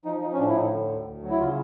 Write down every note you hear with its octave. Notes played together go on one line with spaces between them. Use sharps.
F3 D#4
F3 D#4
C#4
A2 D4
E4
A2 D#4
D3
D2
D2
F#3
E4
C#3 F4